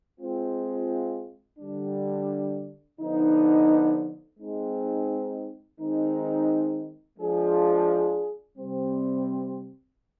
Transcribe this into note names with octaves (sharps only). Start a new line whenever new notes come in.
G#3 C4 F4
D3 G3 D4
D3 F3 B3 D#4
G#3 C4 D#4
D#3 G#3 C4 D#4
F3 G#3 D4 F4 G#4
C3 G3 C4